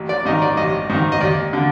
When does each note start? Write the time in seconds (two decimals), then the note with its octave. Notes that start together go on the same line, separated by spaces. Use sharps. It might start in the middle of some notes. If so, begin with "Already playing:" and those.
Already playing: A1
0.09 D5
0.25 G#2 D#3 D#5
0.42 D5
0.57 A1 D#5
0.90 G#2 D#3
1.12 D#5
1.20 D#2 D5
1.53 D3